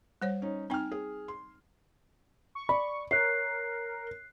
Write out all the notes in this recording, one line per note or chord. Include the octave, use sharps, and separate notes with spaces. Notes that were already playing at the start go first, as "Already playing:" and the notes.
G3 C5 C#5
C#4 D#4
C4 D#4 G5 G#5 F6
G#4
C6
C#6
D5 B5
A#4 C#5 F#6 C7